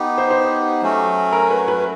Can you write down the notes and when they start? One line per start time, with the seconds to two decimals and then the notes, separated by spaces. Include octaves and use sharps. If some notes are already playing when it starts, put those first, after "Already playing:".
Already playing: B3 D#4 G4
0.18 C5
0.30 C5
0.82 F#3 A3 C#4 F#4
1.32 A#4
1.50 B4
1.68 B4